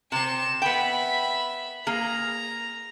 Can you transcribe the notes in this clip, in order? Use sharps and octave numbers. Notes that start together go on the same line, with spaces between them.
C3 C4 C#7 E7
B3 E5 G5 B5
A#3 G#4 A#5